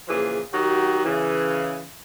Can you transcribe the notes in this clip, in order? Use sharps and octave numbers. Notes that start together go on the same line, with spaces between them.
A#2 C#3 E3 F3 G#4
D#3 F#3 F#4 G4
C#3 E3